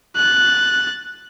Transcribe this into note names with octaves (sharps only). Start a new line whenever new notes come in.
F#6 A6